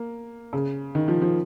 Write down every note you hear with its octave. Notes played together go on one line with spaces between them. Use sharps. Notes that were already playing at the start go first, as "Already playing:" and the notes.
Already playing: A#3
C#3
D#3
F3
F3